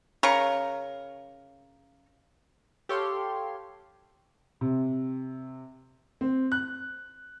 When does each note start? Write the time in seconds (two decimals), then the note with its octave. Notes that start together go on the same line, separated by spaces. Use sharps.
0.23 C#3 A#4 C#6
2.89 G4 A4 C#5 F5 C6
4.61 C3
6.21 C4
6.52 F#6